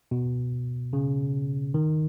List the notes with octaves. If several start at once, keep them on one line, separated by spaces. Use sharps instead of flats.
B2
C#3
D#3